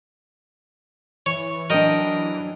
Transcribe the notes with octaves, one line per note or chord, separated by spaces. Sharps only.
E3 C#5
F#3 D4 A#4 D#5 G5